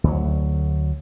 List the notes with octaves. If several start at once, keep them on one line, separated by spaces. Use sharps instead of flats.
D2 F#3